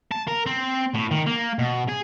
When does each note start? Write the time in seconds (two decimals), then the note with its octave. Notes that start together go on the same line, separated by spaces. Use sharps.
0.12 A5
0.28 A#4
0.46 C4
0.95 A2
1.12 D#3
1.27 A#3
1.59 B2
1.89 G#4